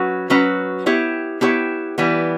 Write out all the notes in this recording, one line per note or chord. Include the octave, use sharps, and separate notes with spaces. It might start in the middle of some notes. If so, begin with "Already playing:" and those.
Already playing: F#3 C#4 F#4 B4
F#3 C#4 F#4 B4
B3 E4 G4 C#5
B3 E4 G4 C#5
E3 G3 B3